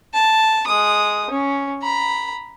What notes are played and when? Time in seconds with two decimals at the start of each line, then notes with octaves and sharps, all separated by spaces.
0.14 A5
0.67 G#3 D#6
1.30 C#4
1.82 A#5 B5